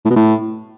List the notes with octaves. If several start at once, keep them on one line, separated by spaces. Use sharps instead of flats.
A2
B2
A2